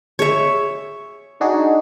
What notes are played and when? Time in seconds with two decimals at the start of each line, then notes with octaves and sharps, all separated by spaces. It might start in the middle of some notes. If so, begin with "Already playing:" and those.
0.19 G#4 C#5 E5
1.41 D4 D#4 F#4 G#4